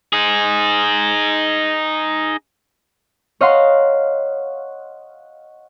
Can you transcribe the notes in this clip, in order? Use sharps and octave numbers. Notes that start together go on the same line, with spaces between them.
D#4 G#4
C#5 D#5 F5 F#5 A#5 C6